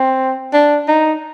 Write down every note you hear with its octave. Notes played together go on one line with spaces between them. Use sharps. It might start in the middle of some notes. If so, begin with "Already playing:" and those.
Already playing: C4
D4
D#4